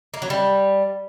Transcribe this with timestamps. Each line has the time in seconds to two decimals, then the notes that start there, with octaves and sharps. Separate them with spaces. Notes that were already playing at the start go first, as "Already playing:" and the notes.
0.14 A#3
0.22 F#3
0.30 G3